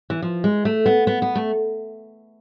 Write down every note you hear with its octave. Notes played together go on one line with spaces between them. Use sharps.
E3
F3
G#3
A3
B3
B3
B3
A3